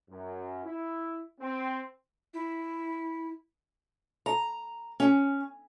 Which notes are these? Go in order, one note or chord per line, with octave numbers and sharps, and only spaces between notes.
F#2
E4
C4
E4
A#5
C#4